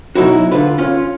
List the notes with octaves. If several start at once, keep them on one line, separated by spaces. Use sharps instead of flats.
B2 F#3 D#4 E4 F#4
D3 F4 B4
C#4 F4